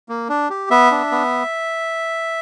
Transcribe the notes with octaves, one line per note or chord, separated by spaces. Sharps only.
A#3
D4
G4
B3 E5
D4
B3